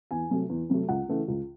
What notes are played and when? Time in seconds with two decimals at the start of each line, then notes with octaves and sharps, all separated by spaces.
0.11 E2 G#5
0.30 C3 F#3 A3
0.49 E2
0.69 C3 F#3 A3
0.89 C#2 F#5
1.08 C#3 E3 A3
1.28 C#2